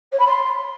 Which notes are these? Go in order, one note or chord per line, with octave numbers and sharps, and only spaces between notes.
C#5
B5
C6